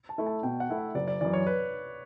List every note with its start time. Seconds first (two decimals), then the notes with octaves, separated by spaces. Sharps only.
0.09 A5
0.18 A3 E4
0.27 A5
0.43 B2 G5
0.60 F#5
0.69 A3 E4
0.78 E5
0.95 F#1 D5
1.08 D5
1.21 F#2 E3 D5
1.33 C#5
1.47 B4